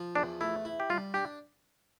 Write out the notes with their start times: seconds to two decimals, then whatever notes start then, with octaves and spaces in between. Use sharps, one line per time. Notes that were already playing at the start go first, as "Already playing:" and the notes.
Already playing: F3
0.15 E2 D4
0.41 A3 E4
0.65 E4
0.80 G4
0.90 G3 F4
1.14 D4 G4